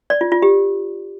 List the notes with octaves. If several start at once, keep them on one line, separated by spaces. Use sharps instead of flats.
D5
F4
F4
G4